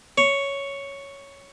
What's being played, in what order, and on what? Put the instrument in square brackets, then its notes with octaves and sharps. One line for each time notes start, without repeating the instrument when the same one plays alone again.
[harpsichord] C#5